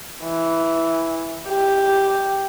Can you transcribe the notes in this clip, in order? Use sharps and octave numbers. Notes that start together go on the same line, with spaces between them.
E3
G4